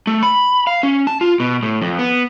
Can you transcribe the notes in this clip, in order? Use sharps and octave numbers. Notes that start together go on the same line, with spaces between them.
A3
B5
F5
C#4
A5
F4
B2
A2
F2
B3